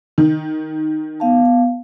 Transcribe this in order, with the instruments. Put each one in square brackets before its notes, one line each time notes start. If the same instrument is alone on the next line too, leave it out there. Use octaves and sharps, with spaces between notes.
[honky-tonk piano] D#3
[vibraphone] B3 F5 A5